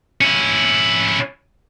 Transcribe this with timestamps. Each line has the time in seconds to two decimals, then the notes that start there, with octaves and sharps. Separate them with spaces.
0.21 C#4 E4